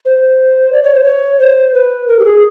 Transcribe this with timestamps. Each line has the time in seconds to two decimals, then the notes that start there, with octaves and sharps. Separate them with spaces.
0.05 C5
0.72 D5
0.83 C#5
0.94 C5
1.04 C#5
1.39 C5
1.74 B4
2.08 A#4
2.19 G4
2.25 G#4